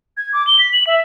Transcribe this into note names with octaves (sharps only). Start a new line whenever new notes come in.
G#6
D6
G7
B6
F#7
E5